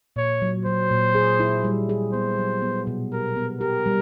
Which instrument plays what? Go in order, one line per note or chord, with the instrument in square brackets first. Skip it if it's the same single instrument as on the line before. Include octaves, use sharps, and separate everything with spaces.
[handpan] A#2 [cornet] C#5
[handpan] F#3
[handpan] F#3 [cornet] C5
[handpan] A#2
G#4
E4
G3
G#4
[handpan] B3 [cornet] C5
[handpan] F#3
B3
B2
[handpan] G4 [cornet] A#4
[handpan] B3
[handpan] G4 [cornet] A#4
[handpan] G3